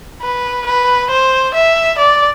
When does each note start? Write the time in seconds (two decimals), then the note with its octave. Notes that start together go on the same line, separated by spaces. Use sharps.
0.22 B4
0.67 B4
1.11 C5
1.54 E5
1.98 D5